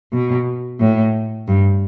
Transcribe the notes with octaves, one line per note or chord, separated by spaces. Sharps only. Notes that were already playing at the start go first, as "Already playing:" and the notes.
B2
A2
G2